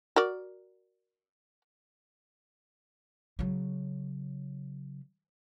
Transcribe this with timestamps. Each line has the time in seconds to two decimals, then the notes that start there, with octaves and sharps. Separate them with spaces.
0.16 F#4 A#4 D5
3.39 C#3 F#3